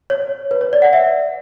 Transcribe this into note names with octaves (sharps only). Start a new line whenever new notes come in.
C#5
B4
C#5
D5
F#5
E5